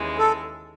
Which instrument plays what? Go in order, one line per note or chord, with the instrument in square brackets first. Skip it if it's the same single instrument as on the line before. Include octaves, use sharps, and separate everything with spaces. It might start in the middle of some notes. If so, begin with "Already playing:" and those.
Already playing: [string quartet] D#2 C#3 E3 G#3
[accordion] A4